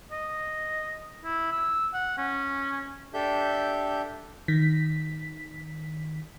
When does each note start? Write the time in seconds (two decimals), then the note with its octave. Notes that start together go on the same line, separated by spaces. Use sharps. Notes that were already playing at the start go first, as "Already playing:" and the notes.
0.11 D#5
1.24 E4
1.52 E6
1.94 F#5
2.18 C#4
3.14 D4 G4 A4 E5 G6
4.48 D#3 B6